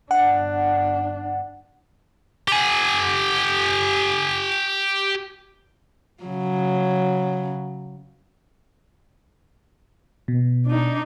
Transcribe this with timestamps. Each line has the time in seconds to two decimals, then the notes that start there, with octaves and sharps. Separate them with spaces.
0.11 G1 D4 F#5
2.48 G4 G#5
6.24 C#3 F#3
10.28 B2
10.67 D4 D#4